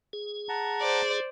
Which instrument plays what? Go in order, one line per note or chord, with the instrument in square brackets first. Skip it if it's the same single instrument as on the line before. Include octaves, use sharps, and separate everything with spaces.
[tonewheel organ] G#4
[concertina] F#5 A5 A#5
[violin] C5 D5